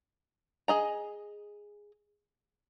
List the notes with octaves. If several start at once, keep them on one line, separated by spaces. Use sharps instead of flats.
G#4 D#5 A#5